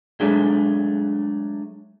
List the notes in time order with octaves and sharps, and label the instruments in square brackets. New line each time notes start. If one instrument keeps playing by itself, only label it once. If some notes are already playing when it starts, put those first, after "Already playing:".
[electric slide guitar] F#3 G#3 A3 D4 G#4